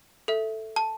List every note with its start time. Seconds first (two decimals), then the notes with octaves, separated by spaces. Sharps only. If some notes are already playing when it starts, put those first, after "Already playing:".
0.28 A4 E5
0.76 A5